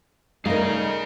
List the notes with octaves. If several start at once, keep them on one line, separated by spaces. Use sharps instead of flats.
G3 A3 D#4 G#4 A#4 F5